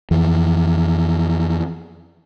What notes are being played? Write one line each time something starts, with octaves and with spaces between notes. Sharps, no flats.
F2 E3